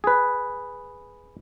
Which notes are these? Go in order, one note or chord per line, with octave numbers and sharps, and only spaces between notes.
G#4 B4